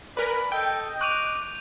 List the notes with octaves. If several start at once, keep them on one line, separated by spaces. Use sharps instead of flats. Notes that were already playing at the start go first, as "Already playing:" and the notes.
A#4 B4 D5 G#5 B5
A4 D#5 G5 G6
C#6 D6 F#6 D#7 F7